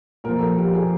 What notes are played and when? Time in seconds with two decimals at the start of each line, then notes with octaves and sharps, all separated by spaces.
0.24 A#2 F3 A#4
0.40 A4
0.58 G4
0.75 G#4